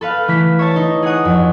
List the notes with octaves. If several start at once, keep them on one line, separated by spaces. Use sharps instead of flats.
A4 B4 F5
E3 A3 B6
C#5 E5 A5
D#4
G#4 C#5 F#5 D#6
F2